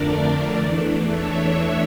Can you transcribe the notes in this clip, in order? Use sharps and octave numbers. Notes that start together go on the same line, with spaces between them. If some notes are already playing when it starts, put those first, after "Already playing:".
Already playing: F2 D3 A3 D4 A#4 D5
E2 E3 A3 D4
C#5 E5